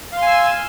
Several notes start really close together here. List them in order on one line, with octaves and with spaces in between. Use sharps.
F5 C6 G#5 E6